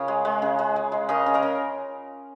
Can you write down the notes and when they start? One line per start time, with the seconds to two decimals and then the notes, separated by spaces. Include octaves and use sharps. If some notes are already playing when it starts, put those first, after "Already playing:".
Already playing: C#3 F4 A#4 C#5 D#5 F5
0.08 G#3
0.25 G#3
0.42 C#3
0.59 G#3
0.76 G#3
0.92 G#3
1.09 C#3 A#4 D#5
1.26 C#3
1.34 A#4 D#5
1.42 C#3